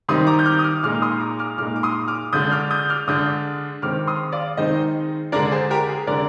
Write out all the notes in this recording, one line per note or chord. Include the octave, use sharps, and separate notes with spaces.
D#3 G3 C4 D#4 C6 D#6
A#5 D6
G6
D6 F6
D#6
D6 F6
A#2 G#3 D#4 D6 F6
C6 D#6
A#5 D6
D6 F6
A#2 G#3 D#4 D6 F6
D6
C6 D#6
D6 F6
D3 G#3 D4 D#6 G6
D6 F6
D#6 G6
D6 F6
D3 G#3 D4 D#6 G6
D#3 G#3 C4 D#4 D6 F6
C6 D#6
D5 F5
D#3 G#3 C4 D#4 C5 D#5
D3 G#3 D4 A#4 D5
G#4 C5
G4 A#4
G#4
D3 G#3 D4 A#4 D5